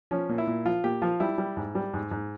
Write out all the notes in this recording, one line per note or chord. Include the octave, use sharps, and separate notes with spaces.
F3 C#4
A#2
E4
A#2
F3 F4
A#2 G4
F3 F4
G3 E4
G3
G#2
G3
G#2
G#2